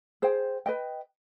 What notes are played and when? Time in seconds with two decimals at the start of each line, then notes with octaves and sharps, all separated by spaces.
0.22 G#4 C5 G5
0.66 B4 D#5 G5